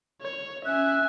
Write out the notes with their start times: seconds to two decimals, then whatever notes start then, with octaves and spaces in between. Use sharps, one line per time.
0.22 C#5
0.66 C#4 E5 G#5 F#6